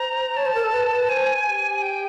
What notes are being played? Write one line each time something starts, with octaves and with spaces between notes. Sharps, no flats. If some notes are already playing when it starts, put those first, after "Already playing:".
Already playing: C5 A#5
C#5 A5
C5
A#4
A4
B4
B4
C5 G#5
G4
G5